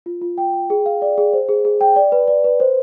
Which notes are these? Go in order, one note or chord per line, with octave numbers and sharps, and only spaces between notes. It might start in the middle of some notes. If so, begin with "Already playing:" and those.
F4
F4
G5
G5
G#4
F5
D5
G#4
C5
G#4
G#4
G5
D5
B4
D5
B4
C5